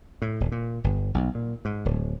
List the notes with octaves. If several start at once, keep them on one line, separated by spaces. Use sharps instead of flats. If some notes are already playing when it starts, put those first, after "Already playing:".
A2
D#1
A#2
G1
B1
A#2
G#2
D1